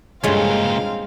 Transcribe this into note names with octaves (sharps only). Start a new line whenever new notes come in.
C#2 G2 A#2 G#3 C4 C#4 F4 F5